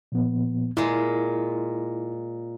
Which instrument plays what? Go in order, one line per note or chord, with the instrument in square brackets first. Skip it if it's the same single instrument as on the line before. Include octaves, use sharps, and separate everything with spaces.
[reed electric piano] A#2 F3 B3
[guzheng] A#2 G#3 [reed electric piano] E4